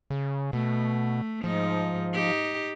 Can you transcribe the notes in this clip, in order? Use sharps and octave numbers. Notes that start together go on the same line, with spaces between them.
C#3
B2 A3
G#2 F3 D#4
D#4 G4